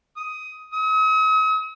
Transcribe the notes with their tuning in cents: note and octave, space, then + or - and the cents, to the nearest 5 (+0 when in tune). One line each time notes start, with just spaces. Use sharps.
D#6 +15
D#6 +45